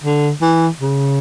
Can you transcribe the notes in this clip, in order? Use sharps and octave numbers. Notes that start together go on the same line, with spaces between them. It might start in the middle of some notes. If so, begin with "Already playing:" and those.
D3
E3
C#3